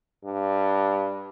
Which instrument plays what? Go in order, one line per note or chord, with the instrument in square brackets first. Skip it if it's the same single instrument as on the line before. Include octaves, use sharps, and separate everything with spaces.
[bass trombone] G2